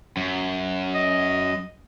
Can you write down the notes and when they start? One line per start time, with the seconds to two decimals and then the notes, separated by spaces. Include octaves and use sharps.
0.17 F#2
0.94 D#5